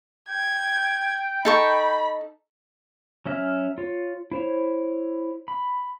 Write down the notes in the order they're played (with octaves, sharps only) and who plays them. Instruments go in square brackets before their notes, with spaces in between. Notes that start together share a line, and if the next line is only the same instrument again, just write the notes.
[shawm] G5 [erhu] G#6
[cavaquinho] D#4 A4 C#6 [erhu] B5
[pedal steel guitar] F#3 C#4 E5 G#5 F6
F4 C#5
E4 C5 C#5
B5